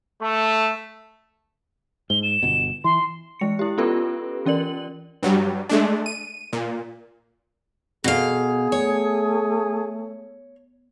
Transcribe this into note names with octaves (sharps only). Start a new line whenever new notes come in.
A3
G#2 G7
E7
G1 B2
E3 C6
E3 G#3 C#7
E4 G4
B3 C#4 F4 G4 A4 B4
E3 C#4 A#4 D5 F#7
G2 F#3 G3
G#3 A3 D4
D#7
A#2
B2 G#4 A4 F5
A3 C#5